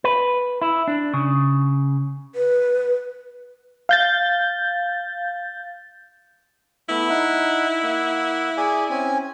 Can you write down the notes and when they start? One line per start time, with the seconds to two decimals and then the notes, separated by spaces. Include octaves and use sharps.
0.04 B4
0.62 E4
0.88 D4
1.14 C#3
2.34 B4
3.89 F5 G6 A6
6.89 A3 B3 E4
7.10 D#4 F#5
7.83 A#3 F#5
8.57 G#4 D5 G#5
8.90 C4 C#4 G#5